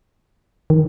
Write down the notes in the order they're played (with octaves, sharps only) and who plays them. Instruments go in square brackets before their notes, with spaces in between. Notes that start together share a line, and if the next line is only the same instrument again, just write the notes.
[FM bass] D#3